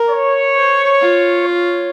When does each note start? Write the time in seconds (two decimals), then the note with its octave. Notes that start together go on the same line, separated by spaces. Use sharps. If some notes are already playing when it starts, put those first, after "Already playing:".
Already playing: A#4
0.11 C#5
0.56 C5
1.01 F4
1.47 C#5